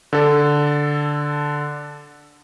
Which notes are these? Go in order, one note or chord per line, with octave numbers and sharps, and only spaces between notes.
D3 A4